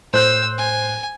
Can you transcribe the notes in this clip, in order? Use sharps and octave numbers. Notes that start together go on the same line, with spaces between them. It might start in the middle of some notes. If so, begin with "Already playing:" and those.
A2 C5 E6 F#6 G6
G#5